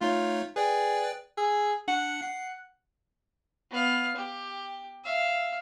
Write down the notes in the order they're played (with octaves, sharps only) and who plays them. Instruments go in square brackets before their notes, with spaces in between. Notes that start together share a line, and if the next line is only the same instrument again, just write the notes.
[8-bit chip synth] A3 D#4 C#5 [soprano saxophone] F4
[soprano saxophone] G#4 [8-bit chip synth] B4 D5 G5
[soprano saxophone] G#4 [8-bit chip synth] E6
[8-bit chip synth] D4 C#7 [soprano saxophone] F#5
[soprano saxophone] F#5 [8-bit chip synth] C7
[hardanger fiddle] B3 F5
G4
E5 F5